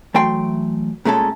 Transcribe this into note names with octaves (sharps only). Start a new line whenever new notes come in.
E3 F#3 A3 G5 C6
A#2 G#3 A3 C#4 A4